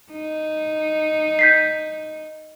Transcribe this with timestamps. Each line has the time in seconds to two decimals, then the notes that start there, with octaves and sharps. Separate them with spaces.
0.13 D#4
1.39 G6 B6 C7